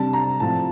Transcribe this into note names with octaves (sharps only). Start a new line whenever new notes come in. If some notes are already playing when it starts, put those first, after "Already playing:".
Already playing: C3 G3 D4 A5
A#5
A2 F3 C4 F4 A5